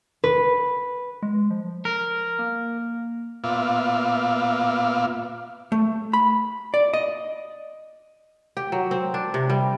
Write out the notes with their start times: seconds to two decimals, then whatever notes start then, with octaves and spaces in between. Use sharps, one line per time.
0.24 B4
1.23 G#3
1.51 F3
1.85 A#4
2.39 A#3
3.44 A#2 B3 F4 E5 F5 D6
5.72 A3
6.13 B5
6.74 D5
6.94 D#5
8.57 G4
8.72 F#3
8.91 C4
9.14 D4
9.34 C3
9.50 G3